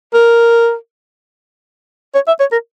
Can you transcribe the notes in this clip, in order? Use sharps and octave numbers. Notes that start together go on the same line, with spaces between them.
A#4
C#5
E5
C#5
A#4